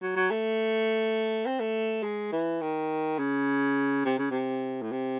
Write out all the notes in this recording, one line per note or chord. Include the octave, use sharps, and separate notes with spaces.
F#3
F#3
A3
C4
A3
G#3
E3
D#3
C#3
C3
C#3
C3
A2
C3